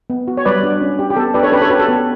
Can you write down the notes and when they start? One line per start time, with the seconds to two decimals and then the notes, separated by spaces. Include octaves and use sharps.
0.10 B3
0.28 F#4
0.37 C#5
0.45 G3 B4 D5
0.63 D4 F#4
0.81 C#4
0.99 G4
1.10 G4
1.16 B3 A4
1.34 D4 G4 B4 D5
1.43 A4 C#5
1.52 C#4 G4 B4
1.61 A4 C#5
1.70 F#4 G4 B4
1.79 A4
1.88 B3